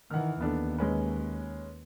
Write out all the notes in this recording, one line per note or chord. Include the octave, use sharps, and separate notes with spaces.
D#3 E3 F#5 F6
D#2 B3 D4 A4
G#3 C#4 B4